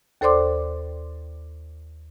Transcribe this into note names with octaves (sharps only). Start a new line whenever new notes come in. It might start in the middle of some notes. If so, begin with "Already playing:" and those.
D#2 A4 C5 D5 C6 D6